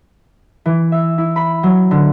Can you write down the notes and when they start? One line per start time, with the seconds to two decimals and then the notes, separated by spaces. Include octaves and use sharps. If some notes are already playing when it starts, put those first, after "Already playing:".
0.66 E3
0.92 E5
1.18 E4
1.36 B5
1.63 F#3
1.91 D3